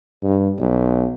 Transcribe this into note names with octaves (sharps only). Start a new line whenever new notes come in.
G2
B1